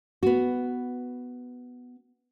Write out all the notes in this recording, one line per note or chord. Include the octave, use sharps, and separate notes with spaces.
B3 F#4